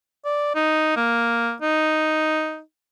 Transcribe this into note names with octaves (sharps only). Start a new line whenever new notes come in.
D5
D#4
A#3
D#4